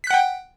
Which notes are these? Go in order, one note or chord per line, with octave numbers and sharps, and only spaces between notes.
F#5 G5 F#6 B6